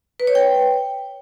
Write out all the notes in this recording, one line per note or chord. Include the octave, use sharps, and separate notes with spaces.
B4
C#5
G5